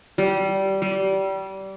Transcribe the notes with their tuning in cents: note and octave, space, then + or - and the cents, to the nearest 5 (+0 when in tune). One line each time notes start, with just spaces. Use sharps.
G3 -20
G3 -25